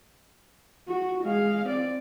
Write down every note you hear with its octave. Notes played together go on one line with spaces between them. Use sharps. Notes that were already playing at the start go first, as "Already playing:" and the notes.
F#4
G#3 F5
C4 D5